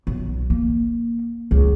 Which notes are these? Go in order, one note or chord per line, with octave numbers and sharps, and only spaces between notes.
B1
A#3
C#2